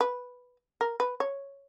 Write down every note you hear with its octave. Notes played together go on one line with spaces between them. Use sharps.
B4
A#4
B4
C#5